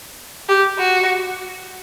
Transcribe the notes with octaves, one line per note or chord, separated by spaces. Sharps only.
G4
F#4